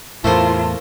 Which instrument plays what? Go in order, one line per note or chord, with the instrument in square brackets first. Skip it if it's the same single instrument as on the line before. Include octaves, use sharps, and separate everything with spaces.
[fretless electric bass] E2 A2 [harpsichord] A3 A#3 C5 [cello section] E4 F4 [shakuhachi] A5